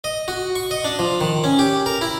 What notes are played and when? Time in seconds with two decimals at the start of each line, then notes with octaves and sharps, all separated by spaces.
0.04 D#5
0.28 F#4
0.56 C#6
0.71 D#5
0.84 D4
0.99 F3
1.21 D#3
1.44 C#4
1.59 G4
1.86 A#4
2.01 E4